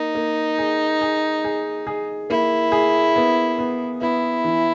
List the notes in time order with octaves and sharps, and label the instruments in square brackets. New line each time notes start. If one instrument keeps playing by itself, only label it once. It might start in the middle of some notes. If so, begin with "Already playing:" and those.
Already playing: [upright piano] A#3 [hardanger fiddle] D#4
[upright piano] A#3
G#4
G#4
G#4
G#4
[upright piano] A#3 [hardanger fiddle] E4
[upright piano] G#4
B3
B3
[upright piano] B3 [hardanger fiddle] E4
[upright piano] E3